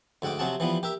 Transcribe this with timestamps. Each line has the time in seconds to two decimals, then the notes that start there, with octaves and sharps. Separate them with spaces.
0.22 D2 G#2 F#5 G5 D6
0.39 C3 F#3 C4 G#4 F#5 A5
0.60 E3 F3 G3 B3
0.83 G4 A#4 E5